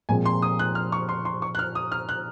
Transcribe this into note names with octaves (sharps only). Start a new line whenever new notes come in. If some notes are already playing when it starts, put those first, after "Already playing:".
A#2 F3 G#3 C4 G#5
C6
D#6
F#6
F6
C#6
C6
C6
C#6
F#6
F6
D#6
F6
F#6